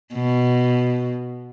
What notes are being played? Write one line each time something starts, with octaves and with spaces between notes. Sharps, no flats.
B2